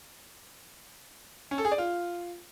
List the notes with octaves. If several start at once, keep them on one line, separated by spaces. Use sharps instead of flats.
C#4
A4
G#4
D5
F4